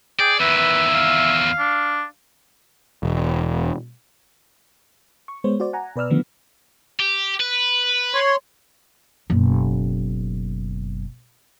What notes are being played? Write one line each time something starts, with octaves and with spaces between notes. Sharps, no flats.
G#4 D5 G5
E2 D#3 B4 E5
E5
F5
D4
E1
C#6
G#3 B3 C5 C#5
F#4 C5 D5
F#5 G#5 A#5
B2 B4 D5 E6 F6
D3 D#3 F3 A3 B3
G4
B4
C#5 C6
F#1 B2